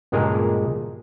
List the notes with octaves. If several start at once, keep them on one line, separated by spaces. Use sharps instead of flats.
C#2 G2 A#2 G#3 G#4 A#4